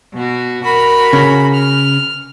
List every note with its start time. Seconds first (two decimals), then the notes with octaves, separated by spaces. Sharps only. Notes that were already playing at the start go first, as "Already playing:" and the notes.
0.13 B2 F#4
0.64 F#4 A#4 B5
1.13 C#3
1.55 F6